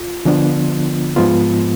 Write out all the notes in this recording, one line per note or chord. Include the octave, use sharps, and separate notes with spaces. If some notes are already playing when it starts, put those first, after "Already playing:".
Already playing: F4
D3 F3 B3 D4 F4
G#2 F3 G#3 B3 F4